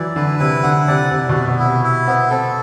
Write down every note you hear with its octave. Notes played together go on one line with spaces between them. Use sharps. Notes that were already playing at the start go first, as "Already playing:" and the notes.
Already playing: E3 F#3 E4 D5
D3 B4
C3 E4
D3 F#5
C3 D5
C3 E4
B2
B3
B2
E4
C3
E4
B3 C4
C4 A4